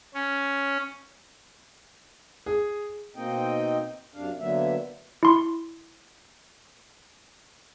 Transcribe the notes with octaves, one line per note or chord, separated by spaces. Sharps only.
C#4
G#4
B2 A#3 C4 D#4 D#5 G5
F#2 C3 D4 F5
D3 F#3 A#3 B3 E5
E4 C6